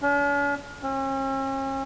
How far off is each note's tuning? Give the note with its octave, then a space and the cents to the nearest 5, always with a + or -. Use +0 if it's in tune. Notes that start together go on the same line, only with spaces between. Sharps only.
C#4 +45
C#4 -45